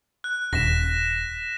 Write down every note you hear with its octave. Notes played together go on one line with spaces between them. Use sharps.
F#6
D#1 A#6 B6 E7